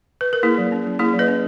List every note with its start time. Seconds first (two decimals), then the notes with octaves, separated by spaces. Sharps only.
0.21 B4
0.33 A#4
0.43 A#3 E4 G#4
0.58 F#3
0.72 C#4
0.86 F#3
0.99 A#3 E4 G#4
1.14 F#3
1.19 B4 D#5
1.28 C#4